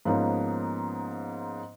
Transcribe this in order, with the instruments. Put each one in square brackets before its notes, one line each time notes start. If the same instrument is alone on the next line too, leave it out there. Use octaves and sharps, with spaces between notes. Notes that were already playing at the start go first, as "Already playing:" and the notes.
[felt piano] G#2 F3 A#3 B3 C#4 D#4